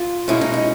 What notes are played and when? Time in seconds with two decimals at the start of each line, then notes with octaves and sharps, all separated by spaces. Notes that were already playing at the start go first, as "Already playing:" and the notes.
Already playing: F4
0.28 B2 G#3 C#4 E4
0.41 D#4
0.54 D#4